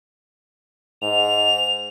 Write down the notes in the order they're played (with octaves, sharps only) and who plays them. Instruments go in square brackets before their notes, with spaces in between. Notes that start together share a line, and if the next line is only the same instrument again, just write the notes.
[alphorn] G#2 [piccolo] F7